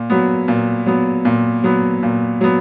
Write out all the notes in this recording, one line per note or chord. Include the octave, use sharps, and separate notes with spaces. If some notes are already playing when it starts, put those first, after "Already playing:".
Already playing: A#2
F#3 B3
A#2
F#3 B3
A#2
F#3 B3
A#2
F#3 B3